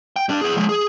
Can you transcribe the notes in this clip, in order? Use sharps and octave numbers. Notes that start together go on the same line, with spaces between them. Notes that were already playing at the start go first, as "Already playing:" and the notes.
G5
G3 D4
B3 G#4
F3 G#3
G#4